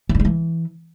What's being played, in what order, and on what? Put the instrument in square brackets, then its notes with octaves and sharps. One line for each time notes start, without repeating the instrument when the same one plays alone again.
[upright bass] F#3
G2
G#3
E3